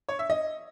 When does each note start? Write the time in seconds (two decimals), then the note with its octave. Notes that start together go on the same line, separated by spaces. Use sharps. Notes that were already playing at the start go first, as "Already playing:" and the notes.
0.09 C#5
0.19 E5
0.30 D#5